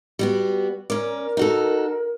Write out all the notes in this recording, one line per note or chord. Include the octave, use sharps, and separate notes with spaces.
G3 B3 F#4
C#4 A#4 D5
D#4 F#4 A4